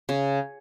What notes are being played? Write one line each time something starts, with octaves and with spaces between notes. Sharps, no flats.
C#3